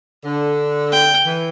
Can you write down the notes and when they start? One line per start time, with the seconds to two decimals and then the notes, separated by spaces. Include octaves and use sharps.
0.24 D3
0.92 G5
1.26 E3